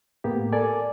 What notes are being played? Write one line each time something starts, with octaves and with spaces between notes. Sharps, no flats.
A2 A#3 B3 G4
A4 A#4 D5 G#5